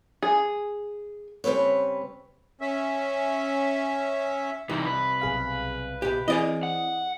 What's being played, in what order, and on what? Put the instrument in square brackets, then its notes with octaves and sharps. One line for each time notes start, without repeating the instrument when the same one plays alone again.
[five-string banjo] G#4
[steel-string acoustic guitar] C#3 G3 C4 B4 C#5
[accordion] C#4 E5
[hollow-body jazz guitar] C2 [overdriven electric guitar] E3 D#4
[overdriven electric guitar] B4
[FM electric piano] B1 G#4 F5
[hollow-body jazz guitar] B2 G4
[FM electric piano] E3 C4 D#6 [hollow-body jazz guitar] G#4 D5 D#5
[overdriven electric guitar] F#5